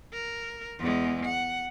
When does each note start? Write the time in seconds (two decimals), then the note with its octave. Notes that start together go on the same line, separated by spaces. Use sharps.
0.13 A#4
0.79 E2 G#3
1.25 F#5